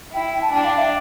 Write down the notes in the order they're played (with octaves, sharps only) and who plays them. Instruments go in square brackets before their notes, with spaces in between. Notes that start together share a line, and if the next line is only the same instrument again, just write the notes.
[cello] E4 [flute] G5
[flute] G5
A5
[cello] D4 [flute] G5
[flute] F5
E5